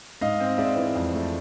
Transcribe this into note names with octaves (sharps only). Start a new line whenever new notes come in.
G#2 D#5 F5
C4
G#3 D5 E5
E3
F2
A3